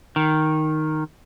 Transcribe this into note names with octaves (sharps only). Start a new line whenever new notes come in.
D#3